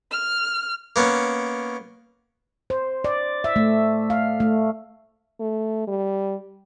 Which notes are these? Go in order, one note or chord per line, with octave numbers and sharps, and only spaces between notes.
F6
A#3 B3 C#4
C5
D5
E5
A3
F5
A3
A3
G3